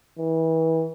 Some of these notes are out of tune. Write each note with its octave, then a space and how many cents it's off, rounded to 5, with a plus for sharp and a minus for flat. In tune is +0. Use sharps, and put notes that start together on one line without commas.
E3 -30